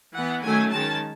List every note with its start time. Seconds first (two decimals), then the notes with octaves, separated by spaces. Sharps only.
0.14 E3 B3 F#5
0.43 D#3 F#3 A3 C#4 G#5
0.71 D#3 G#3 C#4 A5